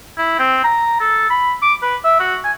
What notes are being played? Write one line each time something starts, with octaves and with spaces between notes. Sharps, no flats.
E4
C4
A#5
A4
B5
D6
B4
E5
F#4
G#5